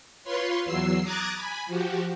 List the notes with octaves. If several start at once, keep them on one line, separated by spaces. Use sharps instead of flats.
F4 B4 C#5 C6
E2 F#3 E6 C7
A#5 D6 D#6 F#6 G#6 A6
G#5 B5
F3 F#4 G4